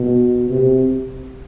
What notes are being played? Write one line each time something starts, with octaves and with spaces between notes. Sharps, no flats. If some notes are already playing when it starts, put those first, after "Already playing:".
Already playing: B2
C3